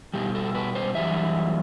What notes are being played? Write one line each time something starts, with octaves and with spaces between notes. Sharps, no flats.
B2 G3 G4
A4
B4
C5
F#2 E3 G3 E5